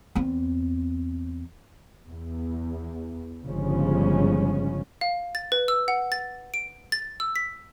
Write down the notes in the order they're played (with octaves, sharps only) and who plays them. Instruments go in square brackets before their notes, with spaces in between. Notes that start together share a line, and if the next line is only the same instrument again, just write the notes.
[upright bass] E2 C4
[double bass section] E2
G1 C#3 F3 G#3 C#4
[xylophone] F5
A6
B4
E6
F#5
A6
D7
A6
E6
B6